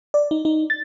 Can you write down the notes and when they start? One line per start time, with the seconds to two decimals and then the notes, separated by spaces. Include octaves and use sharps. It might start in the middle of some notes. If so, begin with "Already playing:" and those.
0.14 D5
0.31 D#4
0.45 D#4
0.70 A6